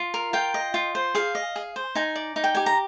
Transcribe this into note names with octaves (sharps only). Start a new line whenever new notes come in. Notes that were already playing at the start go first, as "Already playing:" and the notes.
Already playing: F4
A#4
F4 G5
D#5
F4
C5
G#4 F5
D#5
G#4
C5
D#4 G#5
D5
D#4
G5
G4 G#5
A#5